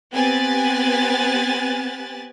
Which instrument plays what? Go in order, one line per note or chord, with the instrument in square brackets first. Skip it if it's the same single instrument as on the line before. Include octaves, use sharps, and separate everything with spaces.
[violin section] B3 C4 G4 G#5 F#6 A6